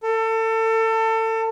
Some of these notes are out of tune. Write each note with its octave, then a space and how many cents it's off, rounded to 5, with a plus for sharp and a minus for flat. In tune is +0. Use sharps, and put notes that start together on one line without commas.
A4 +30